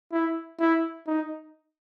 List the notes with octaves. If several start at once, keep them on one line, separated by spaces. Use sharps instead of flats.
E4
E4
D#4